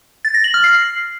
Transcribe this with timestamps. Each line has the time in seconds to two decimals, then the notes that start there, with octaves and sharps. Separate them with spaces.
0.25 A6
0.34 A#6
0.44 F#7
0.54 F6
0.64 C7